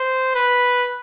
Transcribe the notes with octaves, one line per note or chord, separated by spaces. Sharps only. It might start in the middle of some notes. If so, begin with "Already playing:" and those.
Already playing: C5
B4